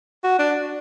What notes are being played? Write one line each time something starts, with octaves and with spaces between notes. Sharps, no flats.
F#4
D4